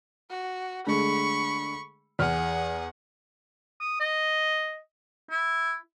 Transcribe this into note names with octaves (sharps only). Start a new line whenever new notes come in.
F#4
D3 G#3 A3 B5 C#6
E2 G#4 F#5 F6
D#6
D#5
E4